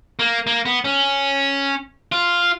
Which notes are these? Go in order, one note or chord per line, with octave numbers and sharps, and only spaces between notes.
A#3
A#3
B3
C#4
F4